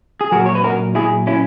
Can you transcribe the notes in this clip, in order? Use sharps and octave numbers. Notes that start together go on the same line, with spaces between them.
G#4
A#2 F#3 F#4 A#4
C#5
B4
F#4 A#4
E4 G#4
C#4 E4